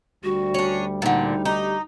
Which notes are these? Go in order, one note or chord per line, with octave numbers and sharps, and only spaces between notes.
D2 G3 F#4
C#4 D4
A#2 D3 D#4
D#4 G4